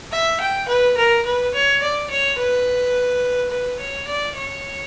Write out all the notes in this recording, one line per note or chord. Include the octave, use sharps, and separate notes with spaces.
E5
G5
B4
A#4
B4
C#5
D5
C#5
B4
B4
C#5
D5
C#5